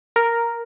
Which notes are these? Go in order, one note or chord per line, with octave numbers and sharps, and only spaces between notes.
A#4